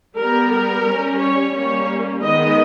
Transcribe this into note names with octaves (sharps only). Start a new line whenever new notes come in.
G3 B3 A#4
A#4
G3 C#4
C#5
G3 A#3 C#4 C#5
D#3 G#3 B3 D#5